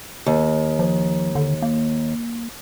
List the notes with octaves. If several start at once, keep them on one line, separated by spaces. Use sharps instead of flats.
D#2
F3
D3
A#3